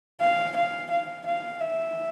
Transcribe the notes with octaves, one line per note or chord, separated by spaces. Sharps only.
F5
F5
F5
F5
E5